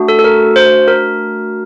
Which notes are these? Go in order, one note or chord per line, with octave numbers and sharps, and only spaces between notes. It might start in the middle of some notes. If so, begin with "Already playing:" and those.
Already playing: A3 D4 F#4
A4
A4
A#4
C5
A#4